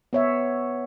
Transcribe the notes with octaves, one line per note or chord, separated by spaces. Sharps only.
B3 C#5 E5